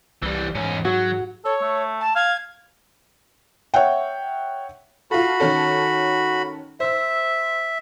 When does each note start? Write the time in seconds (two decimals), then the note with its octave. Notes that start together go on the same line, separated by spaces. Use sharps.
0.23 C2 E3 G3
0.55 E2 G#2 C#4
0.85 F#3 F#4
1.45 A4 C#5
1.62 A3
2.00 A5
2.16 F5 G#6
3.74 C#5 E5 F#5 G5
5.11 F4 F#4 A4 B5
5.40 D#3 C#4 A4
6.80 C5 E5 E6